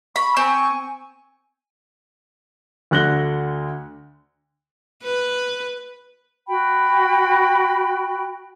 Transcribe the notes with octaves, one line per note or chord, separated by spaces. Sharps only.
B5 C#6
C4 G#5 C#6
D2 D3 F#6 A#6 G7
B4
F#4 G5 B5